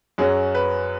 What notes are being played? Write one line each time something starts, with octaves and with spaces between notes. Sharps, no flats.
F#2 F#3 C#4 G#4
B4